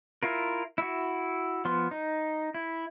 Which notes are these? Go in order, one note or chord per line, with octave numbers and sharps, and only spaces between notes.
E4 F4 A#4
E4 F#4
F3 B3 C6
D#4
E4